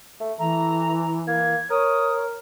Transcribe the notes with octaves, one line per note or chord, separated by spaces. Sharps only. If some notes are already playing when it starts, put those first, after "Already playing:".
A3
E3 A3 A#5
A#3 G#6
A#4 C#5 D#6